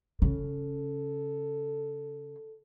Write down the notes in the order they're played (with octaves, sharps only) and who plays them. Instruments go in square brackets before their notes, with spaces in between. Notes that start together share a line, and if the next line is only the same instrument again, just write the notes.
[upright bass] C#3 [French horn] A4